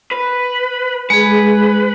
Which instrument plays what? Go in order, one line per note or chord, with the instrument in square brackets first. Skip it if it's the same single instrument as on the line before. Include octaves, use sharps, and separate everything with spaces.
[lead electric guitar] B4
[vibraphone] G#3 G#4 [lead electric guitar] B4